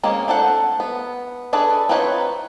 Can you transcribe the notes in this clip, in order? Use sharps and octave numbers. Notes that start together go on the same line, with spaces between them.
G#3 A#3 C4 C#4
C4 D4 A4 F#5
B3
D4 G#4 A4 B4
C4 D#4 F4 B4 C#5